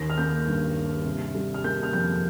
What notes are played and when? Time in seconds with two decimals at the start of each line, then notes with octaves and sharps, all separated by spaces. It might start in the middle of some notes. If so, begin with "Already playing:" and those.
Already playing: D#2 D#3 A#6
0.10 F6
0.18 A#3 G6
0.48 G2
0.76 G2
1.05 C3
1.35 G3
1.54 F6
1.64 A#3 G6
1.83 F6
1.93 F2 G6